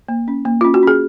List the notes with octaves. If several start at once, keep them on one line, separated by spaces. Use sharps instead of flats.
A#3
C#4
A#3
C#4 F4
F#4
C#4 G#4